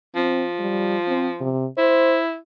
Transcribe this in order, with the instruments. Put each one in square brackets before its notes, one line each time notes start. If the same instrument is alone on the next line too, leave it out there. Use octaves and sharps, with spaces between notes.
[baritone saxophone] F3 [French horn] C4
[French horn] G3
C4
C3
[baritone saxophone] E4 [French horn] C5